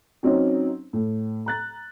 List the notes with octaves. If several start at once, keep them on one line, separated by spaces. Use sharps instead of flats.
F#3 C4 C#4 D#4
A2
A#5 F#6 A6